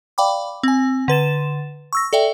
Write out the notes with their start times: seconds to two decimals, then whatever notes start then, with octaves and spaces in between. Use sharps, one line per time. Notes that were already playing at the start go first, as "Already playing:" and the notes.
0.18 D5 F5 G5 B5 D6
0.63 C4 G#5
1.08 D3 B4 A6 E7
1.93 C#6 E6 A#6
2.13 A4 D5 E5 G5